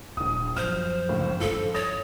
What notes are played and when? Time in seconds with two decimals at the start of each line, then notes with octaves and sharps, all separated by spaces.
0.17 D1 A#1 D#6
0.57 F#2 F3 C5 F6
1.09 G1 C#2 A2
1.40 G2 F3 C#4 A4
1.74 C#5 D#6 A6 A#6